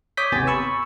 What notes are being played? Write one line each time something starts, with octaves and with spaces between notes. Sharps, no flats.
C#5 D6 D#6 G6 B6
G#1 D#2 C3 B3 G#5 A6
B5 C#6 E6